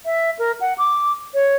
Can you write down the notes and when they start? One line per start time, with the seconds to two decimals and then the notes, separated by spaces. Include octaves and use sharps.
0.05 E5
0.39 A#4
0.61 F#5
0.78 D6
1.34 C#5